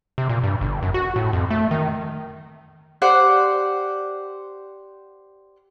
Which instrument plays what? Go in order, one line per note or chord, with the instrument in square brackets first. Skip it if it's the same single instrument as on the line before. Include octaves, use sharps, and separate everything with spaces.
[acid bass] C3
A#2
G2
G1
F#2
F#4
A2
F2
A3
D#3
[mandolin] G4 C5 D5 F#5